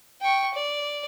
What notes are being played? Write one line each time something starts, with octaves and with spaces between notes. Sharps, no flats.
G5 C#6
D5